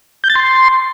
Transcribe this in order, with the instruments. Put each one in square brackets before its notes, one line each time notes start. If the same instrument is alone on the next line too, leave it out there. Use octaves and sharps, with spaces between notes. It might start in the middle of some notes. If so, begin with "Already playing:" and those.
[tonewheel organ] G6
A6
C6